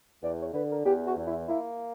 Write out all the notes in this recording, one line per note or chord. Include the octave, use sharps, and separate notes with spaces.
E2 D5
C#5
D3 B4
A#4
E2 G4
F#4
E2
E4
A#3 E4